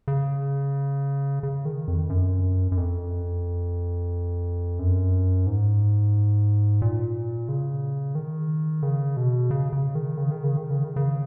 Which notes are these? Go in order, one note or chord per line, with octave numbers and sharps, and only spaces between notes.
C#3
C#3
D#3
F2
F#2
F#2
F2
F#2
G#2
A#2
C#3
D#3
C#3
B2
C#3
C#3
D#3
C#3
D#3
C#3
D#3
C#3
D#3
C#3